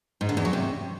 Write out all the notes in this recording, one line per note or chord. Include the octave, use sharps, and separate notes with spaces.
G#2
D3
E2
F#3
C3